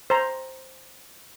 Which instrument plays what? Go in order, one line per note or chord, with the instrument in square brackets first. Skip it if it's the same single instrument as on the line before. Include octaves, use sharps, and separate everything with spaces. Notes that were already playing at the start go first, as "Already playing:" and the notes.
[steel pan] C5 A#5